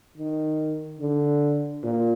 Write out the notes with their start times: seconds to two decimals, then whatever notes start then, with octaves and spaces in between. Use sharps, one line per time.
0.17 D#3
1.00 D3
1.83 A#2